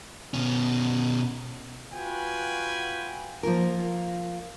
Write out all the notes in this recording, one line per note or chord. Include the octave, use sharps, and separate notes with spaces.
B2 C#4
F4 F#4 B4 G5 G#5
F3 A#3 F4 A#4